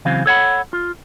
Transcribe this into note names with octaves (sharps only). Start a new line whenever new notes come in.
C#3 E3 F#3 C4 F5
A4 C#5 F#5 B5
F4